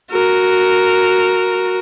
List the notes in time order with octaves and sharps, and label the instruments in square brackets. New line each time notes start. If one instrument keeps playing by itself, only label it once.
[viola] F#4 A#4